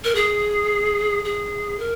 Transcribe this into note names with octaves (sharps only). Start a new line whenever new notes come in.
A#4
G#4
G#4
A#4